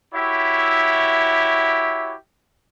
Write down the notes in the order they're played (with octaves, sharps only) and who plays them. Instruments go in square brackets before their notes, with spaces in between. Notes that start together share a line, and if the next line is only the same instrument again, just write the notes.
[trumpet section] E4 F#4 G4 C#5 E5